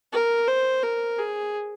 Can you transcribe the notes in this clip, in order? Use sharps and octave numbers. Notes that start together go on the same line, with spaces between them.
A#4
C5
A#4
G#4